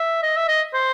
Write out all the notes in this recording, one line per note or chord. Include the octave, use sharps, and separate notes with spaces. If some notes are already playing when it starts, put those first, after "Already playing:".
Already playing: E5
D#5
E5
D#5
C5